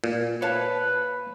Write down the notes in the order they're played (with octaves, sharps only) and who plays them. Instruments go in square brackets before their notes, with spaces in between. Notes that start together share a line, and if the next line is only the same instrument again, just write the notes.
[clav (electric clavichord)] A#2
[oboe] B4 [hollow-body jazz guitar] C#5 F5 A5